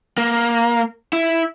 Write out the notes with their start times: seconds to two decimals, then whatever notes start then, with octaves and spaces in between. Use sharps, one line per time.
0.18 A#3
1.13 E4